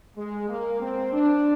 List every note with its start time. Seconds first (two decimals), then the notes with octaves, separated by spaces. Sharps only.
0.16 G#3
0.48 A#3
0.80 C4
1.12 D4